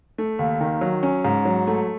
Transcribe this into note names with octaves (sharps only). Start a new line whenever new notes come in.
A3
D#2
D#3
F#3
C#4
G#2
F#3
A3